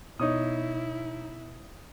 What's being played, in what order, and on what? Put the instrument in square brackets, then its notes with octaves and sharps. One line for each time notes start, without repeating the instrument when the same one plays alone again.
[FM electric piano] B2 [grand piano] D#4 C#5 D#6 [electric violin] E4